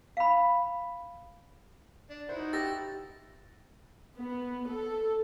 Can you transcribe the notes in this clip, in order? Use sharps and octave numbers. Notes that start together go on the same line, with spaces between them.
F5 B5
D4
D#4 E4 F#4 C5
G4 E6 A6 A#6
B3
A4